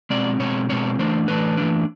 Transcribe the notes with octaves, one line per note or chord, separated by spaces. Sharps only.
B2 G#3 C4 D5
B2 G#3 C4 C#5
B2 G#3 C4 C#5
E3 A3 D4 C5
E3 A3 D4 B4
E3 A3 D4